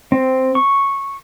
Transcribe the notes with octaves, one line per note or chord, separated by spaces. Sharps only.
C4
C#6